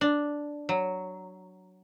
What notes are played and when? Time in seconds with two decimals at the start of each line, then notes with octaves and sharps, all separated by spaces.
0.01 D4
0.69 F#3